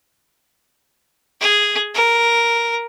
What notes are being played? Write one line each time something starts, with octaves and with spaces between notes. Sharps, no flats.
G#4
A#4